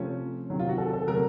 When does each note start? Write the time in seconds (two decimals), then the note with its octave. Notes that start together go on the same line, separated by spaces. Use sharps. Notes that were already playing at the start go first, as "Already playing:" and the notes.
Already playing: C3 F3 A3 C#4
0.50 C3 D#3 F#3
0.59 F4
0.69 F#4
0.78 A4
0.93 A4
1.07 C3 F#3 A3 A#4